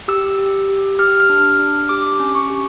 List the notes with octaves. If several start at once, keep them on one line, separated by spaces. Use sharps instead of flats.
G4 E6
G4
G4
G4 F6
F6
D4
D4
G4 D6
C#4
C#6
G4